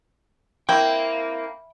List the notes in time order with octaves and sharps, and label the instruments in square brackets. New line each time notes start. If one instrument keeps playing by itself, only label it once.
[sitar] A#3 C4 [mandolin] E4 [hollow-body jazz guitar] G5